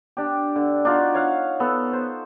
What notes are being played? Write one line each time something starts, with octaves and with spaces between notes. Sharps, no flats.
D4 G4
D3
D4 D#4 F4 F#4
C#5 F5 F#5
B3 A4
C5